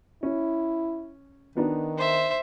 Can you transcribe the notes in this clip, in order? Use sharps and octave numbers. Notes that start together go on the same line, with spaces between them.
C#4 E4
D#3 B3 D4 D#4
C5 E5